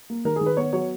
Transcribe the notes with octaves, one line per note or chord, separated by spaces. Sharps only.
A#3
D#3 A#4
G#4
D#3
B4
B3 C#5
F#3 C#5